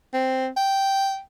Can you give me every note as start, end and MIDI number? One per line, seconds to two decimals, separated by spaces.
0.14 0.48 60
0.57 1.20 79